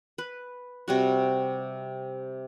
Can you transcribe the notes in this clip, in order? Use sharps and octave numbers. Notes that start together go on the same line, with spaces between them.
B4
C3 G3 F#4